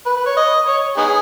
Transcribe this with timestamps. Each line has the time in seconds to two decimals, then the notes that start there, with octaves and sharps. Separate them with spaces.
0.06 B4
0.17 B4
0.26 C#5
0.37 D#5
0.67 C#5
0.97 B3 D#4 G#4